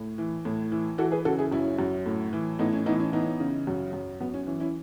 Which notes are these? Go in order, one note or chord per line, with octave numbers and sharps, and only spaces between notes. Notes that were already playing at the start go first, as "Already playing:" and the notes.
Already playing: A2
E3
A2
E3
E3 F#4 A4
G#4 B4
C#3 F#4 A4
E4 G#4
F#2 C#4 E4
F#2
A2
E3
A2 B3 D#4
C#4
E3 B3 D#4
C#4
E3 B3 D#4
C#3
F#2
F#2
F#2 B3
C#4
E3 C#4
C#4 E4